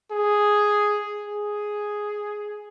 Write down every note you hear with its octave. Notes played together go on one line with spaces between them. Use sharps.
G#4
G#4